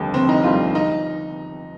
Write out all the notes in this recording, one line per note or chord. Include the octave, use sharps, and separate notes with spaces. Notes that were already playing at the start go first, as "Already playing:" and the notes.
Already playing: F1 D#2 D3 G3
F1 C4
D#4
D#2 D3 G3 F4
D#4